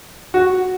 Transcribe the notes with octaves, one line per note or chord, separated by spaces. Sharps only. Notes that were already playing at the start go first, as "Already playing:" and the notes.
F#4